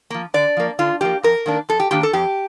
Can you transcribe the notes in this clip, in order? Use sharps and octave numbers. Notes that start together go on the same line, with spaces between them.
F3 A#3
D3 D5
F3 A#3
D3 F4
F3 A#3 G4
F2 A#4
D#3 A#3 D4
F2 A4
G4
D#3 A#3 D4 G4
A4
F2 G4